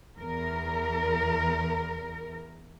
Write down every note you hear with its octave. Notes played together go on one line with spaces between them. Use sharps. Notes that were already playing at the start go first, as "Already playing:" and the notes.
E2 A#4